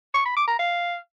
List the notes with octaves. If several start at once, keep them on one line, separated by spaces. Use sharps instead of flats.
C#6
B5
D6
A#5
F5